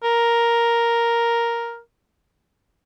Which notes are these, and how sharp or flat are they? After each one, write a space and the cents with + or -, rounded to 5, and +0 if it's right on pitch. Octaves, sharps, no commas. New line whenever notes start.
A#4 +5